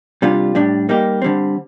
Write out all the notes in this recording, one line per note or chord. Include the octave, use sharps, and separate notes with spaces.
C3 G3 D4 F4
A2 G3 D4
G3 A#3 D#4 G4
D3 G3 C4